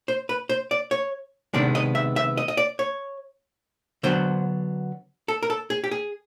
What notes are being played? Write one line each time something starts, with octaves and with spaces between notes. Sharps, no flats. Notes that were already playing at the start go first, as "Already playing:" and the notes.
C5
B4
C5
D5
C#5
C3 D#3 G#3 B3 D4 D5
D#5
E5
E5
D#5
D#5
D5
C#5
D3 F#3 B3 D4 C5
A4
A#4
A4
G#4
G4
G#4